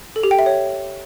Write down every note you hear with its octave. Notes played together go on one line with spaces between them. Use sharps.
A4
G4
G5
E5
C#5